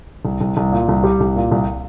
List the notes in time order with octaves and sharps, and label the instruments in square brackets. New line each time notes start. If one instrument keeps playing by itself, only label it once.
[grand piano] C2
C2
C2
A#2
C2
G3
C2
A#2
C2